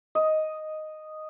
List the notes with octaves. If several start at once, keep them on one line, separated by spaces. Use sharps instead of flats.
D#5